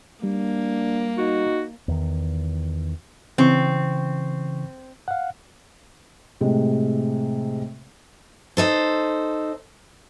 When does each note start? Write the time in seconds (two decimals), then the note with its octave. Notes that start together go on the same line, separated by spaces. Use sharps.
0.23 G3 A#3 D4
1.18 D#4 F#4
1.88 E2 D#3
3.38 C#3 E3 C4 C#6
5.08 F5 F#5
6.41 A2 C3 G#3
8.57 D#4 A4 C5